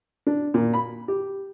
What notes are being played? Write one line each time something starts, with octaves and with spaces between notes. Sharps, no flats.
D4
A#2
B5
G4